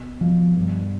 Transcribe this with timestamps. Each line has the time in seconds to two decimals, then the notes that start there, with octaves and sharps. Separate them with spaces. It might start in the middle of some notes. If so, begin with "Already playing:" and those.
Already playing: B2
0.21 B2 F3
0.56 G2